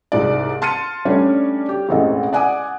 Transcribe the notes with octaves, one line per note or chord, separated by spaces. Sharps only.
C2 G#2 D5
A5 C6 F6 A6 C#7 D#7
G3 A3 C#4 D4 C#5 D5
G4
E1 A1 C4 A4 D#5
D5 F#5 G#5 D6 D#6